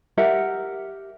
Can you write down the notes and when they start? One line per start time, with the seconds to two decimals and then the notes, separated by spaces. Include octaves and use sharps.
0.17 G4 A#4 E5 F#5